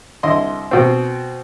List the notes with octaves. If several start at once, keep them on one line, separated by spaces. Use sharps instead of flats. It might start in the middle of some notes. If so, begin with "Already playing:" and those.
C2 D3 E4 D#5 C6
B2 C4